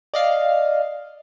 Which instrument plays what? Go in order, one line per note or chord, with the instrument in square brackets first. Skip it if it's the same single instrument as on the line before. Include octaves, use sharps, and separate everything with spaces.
[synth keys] D5 D#5 F5